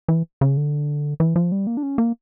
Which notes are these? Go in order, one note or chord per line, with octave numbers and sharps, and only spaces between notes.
E3
C#3
D3
E3
F3
G3
A#3
D4
C#4
A#3